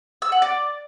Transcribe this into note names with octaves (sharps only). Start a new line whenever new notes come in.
E6
F#5
D5